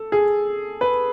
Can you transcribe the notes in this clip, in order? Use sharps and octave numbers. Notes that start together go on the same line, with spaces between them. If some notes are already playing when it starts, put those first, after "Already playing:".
Already playing: A4
G#4
B4